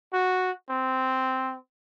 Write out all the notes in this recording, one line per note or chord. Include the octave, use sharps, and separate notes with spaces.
F#4
C4